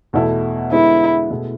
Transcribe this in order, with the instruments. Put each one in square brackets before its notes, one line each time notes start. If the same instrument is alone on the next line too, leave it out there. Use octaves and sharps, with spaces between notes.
[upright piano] E2 B2 A3 E4 A4
[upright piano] D3 G#3 B3 [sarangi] E4
[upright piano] B2 A3 E4 G#4